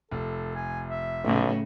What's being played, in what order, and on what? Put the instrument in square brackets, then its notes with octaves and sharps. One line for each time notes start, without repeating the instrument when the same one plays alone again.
[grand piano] F1 [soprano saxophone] A4
[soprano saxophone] G#5
E5
[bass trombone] B1 [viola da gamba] A2 C#3